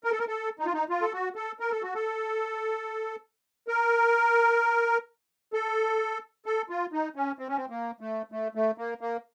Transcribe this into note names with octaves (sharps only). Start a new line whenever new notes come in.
A#4
A4
A#4
A4
D#4
F4
D#4
F4
A4
F#4
A4
A#4
A4
F#4
A4
A#4
A4
A4
F4
D#4
C#4
C4
C#4
C4
A#3
A3
A3
A3
A#3
A#3